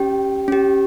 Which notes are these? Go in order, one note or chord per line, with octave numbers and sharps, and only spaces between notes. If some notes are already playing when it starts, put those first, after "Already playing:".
Already playing: C#4 G4 G5
C#4 G4